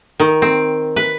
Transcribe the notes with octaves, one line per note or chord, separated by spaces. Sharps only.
D#3
C4
B4